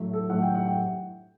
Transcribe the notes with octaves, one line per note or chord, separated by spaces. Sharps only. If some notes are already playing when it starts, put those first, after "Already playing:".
Already playing: A2 F#3 A3
A4
A2 F#3 A3 F#5
G5
F#5
G5